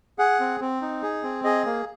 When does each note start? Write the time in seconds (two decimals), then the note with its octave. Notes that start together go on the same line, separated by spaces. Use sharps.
0.19 G#4 F#5
0.40 C4
0.60 C4
0.82 D#4
1.03 G#4
1.23 C4
1.44 G#4 D#5
1.66 A#3